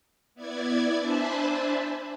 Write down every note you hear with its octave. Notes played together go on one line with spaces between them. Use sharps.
B3 E4 D5 G#6
D4 C5 E5 G#5 A5 B5